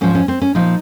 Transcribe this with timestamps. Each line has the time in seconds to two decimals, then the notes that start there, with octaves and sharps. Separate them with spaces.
0.01 G#2 F3 C#4
0.15 C#4
0.28 C4
0.41 C#4
0.55 A#2 F3 D#4